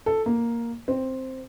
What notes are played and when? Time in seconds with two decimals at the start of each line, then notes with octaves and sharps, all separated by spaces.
0.06 A4
0.26 A#3
0.88 C4